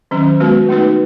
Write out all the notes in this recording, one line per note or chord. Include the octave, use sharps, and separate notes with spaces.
D#3 F#3 C#4
G#3 B3 F#4 B4
A3 D#4 F#4 B4